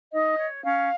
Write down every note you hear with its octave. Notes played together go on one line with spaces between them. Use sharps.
D#4 D#5
C#5
C#4 F5